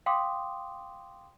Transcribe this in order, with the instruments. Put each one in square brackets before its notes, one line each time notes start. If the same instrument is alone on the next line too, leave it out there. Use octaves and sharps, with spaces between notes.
[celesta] F5 G5 C6 D6 D#6